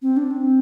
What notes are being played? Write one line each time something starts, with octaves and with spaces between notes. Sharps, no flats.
C4
D4
C4